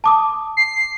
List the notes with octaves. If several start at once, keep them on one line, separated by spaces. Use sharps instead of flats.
A5 D6 D#6
C7